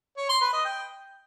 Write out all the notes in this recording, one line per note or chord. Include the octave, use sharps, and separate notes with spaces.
C#5
C6
B4
D#5
G5